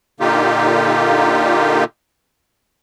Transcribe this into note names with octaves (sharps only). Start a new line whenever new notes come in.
A#2 D3 A#3 D#4 F4 G4